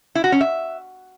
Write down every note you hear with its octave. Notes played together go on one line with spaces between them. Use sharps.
E4
F#4
C#4
E5